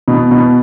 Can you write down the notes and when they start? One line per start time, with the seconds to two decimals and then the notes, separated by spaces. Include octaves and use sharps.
0.08 B2
0.31 B2